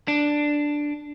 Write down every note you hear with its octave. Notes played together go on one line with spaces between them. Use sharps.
D4